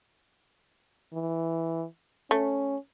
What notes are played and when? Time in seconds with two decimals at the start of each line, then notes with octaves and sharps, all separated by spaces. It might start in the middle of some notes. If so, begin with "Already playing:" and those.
1.13 E3
2.31 A3 C#4